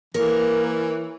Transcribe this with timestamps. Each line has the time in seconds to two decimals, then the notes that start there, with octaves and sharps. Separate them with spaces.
0.14 E3 A#3 A#4 C#5